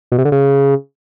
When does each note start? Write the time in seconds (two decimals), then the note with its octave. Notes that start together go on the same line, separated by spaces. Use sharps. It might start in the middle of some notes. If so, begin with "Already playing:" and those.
0.12 B2
0.18 C3
0.25 D3
0.32 C#3